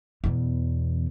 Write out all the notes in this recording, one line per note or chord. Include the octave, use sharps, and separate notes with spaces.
E2 B2